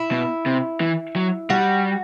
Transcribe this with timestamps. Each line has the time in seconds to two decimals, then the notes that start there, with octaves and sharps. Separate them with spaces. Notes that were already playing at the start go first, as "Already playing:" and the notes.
Already playing: E4
0.11 B2
0.46 C3
0.81 E3
1.16 F#3
1.50 G3 F#4